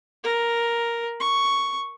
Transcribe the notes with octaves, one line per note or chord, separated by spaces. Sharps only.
A#4
C#6